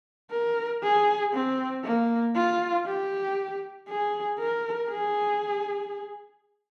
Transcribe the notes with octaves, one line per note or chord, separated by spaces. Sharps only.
A#4
G#4
C4
A#3
F4
G4
G#4
A#4
G#4